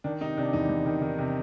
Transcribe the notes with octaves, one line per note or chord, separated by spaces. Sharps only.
D#3 D4
C3 D#4
C3 D4
E2 D#4
E2
D#3
D#3
C3